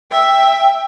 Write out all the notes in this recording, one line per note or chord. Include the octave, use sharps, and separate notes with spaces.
E5 G5